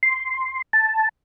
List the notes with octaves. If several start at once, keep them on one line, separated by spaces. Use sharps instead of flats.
C6
A5